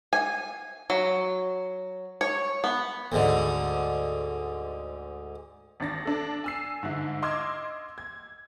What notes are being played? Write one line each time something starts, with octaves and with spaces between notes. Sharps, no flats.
G#5
F#3
C#5
B3
D2 G#2 D3
G#1 D4 A6 A#6
D4 A4
G#5 E6 C7
G#2 D3 E4
D#5 C6 D6 E6 F6 G#6
G#6